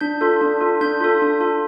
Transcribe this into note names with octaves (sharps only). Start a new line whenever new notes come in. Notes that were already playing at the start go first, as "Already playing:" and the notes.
D4 G6
F4 A4
D4
F4 A4
D4 G6
F4 A4
D4
F4 A4